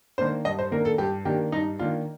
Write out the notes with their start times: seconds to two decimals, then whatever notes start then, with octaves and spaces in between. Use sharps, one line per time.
0.18 D#3 A#3 D4 C5
0.45 G2 D#5
0.59 C5
0.71 D#3 A#3 D4 A#4
0.85 A4
0.98 G2 G4
1.25 D#3 A#3 D4 G4
1.52 G2 D#4
1.79 D#3 A#3 D4 F4